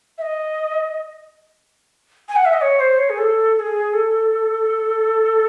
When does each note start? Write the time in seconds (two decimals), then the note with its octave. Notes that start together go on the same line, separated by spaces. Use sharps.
0.18 E5
0.22 D#5
2.29 G#5
2.36 F#5
2.45 E5
2.53 D#5
2.61 C#5
2.80 C5
2.99 C#5
3.09 G#4
3.18 A4
3.55 A4
3.60 G#4
3.93 A4